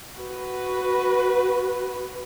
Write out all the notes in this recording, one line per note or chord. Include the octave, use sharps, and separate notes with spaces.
F#4 B4